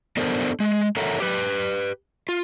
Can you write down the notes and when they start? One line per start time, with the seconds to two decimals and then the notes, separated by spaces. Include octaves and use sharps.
0.17 B3 D4 A4 A#4 C5
0.60 G#3
0.97 A4 A#4 C#5 E5 F#5 A#5
1.20 G4 B4
2.29 F4